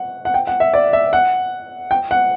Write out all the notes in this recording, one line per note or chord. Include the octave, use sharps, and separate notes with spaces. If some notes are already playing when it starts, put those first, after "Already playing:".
Already playing: F#5
F#5
G5
F#5
E5
D5
E5
F#5
G5
F#5